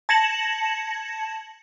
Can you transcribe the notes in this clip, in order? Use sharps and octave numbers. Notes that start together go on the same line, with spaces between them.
A5 G#6 A#6 C#7 E7 F#7